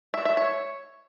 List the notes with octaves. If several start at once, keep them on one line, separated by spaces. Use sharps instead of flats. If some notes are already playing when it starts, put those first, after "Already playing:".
E5
E5
C#5